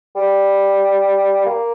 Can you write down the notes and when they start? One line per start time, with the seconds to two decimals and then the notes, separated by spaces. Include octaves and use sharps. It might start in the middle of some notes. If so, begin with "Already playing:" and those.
0.16 G3
1.46 A#3